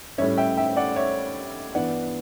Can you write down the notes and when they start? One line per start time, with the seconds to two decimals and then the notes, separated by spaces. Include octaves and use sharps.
0.18 A2 G3 C#4 C#5 E5
0.37 E5 G5
0.57 E5 G5
0.77 D5 F#5
0.96 C#5 E5
1.75 G2 E3 B3 D4 D5 F#5